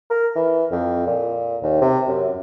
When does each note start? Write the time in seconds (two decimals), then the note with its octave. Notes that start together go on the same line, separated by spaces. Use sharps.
0.11 A#4
0.36 E3
0.72 F2
1.07 A#2
1.63 D#2
1.82 C3
2.08 F#2